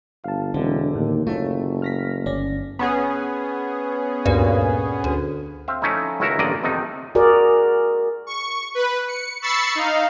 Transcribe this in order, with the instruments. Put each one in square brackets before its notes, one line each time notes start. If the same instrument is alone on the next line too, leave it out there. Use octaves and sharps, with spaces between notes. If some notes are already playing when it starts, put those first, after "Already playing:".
[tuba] G1 [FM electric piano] F5 A5
[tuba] E1 [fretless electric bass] D3 [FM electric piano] C4
[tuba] D#2 [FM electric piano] A2
[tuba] F#1 [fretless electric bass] A3 [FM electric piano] F4 C#5
[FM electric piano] F6 A#6 B6
[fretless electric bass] G1 [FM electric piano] C#4 D5 A#6
[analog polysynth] B3 C#4 G#4
[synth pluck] D2 G2 A#2
D2
[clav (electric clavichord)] C4 E5 F5
F3 A3 C#4 D#4 E4
C#2 D#3 E4 F#4 A#4 E5
A1 G2 D3 A#3 D5 D#5
F2 C3 D#3 B3 D#4
[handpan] F#4 G#4 A#4 D5
[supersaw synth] C#6
B4
C#7
B5 C#6 E6 A6 C7 C#7
D#4 F5